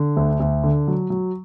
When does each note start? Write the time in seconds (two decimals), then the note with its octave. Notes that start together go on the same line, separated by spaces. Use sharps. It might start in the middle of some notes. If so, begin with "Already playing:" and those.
Already playing: D3
0.17 D2
0.40 D2
0.64 D3
0.88 F#3
1.10 F#3